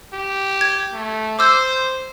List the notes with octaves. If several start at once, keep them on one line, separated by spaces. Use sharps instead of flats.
G4
G#6
A3
C5 D6 E6 G6